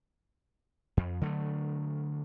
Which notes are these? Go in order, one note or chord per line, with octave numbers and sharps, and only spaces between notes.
F2
D3 F#3 A3